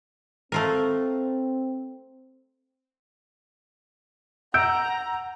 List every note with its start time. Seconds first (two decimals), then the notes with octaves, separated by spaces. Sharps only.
0.52 A3 C4 F4 A#4
4.54 F#5 A#5 E6 G6 D7